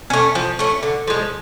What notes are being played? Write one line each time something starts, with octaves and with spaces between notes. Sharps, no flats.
A3 C#4
F3
A3 C#4
D3
F3 G#3